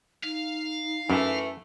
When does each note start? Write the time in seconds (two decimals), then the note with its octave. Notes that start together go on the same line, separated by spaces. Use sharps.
0.24 D#4 F5
1.10 F#2 E3 A3